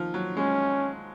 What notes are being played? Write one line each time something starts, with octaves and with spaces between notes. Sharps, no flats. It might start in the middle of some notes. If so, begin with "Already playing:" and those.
Already playing: D#3 F3
F#3
G#3 C#4